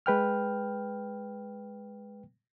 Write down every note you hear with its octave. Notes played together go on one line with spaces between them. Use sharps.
G#3 B4 G5 F6